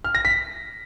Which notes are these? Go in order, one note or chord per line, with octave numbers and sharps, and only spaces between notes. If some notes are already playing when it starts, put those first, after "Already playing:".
F6
A#6
B6